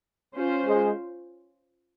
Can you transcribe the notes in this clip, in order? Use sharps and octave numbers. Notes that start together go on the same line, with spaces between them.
C#4 F4 C5
G#3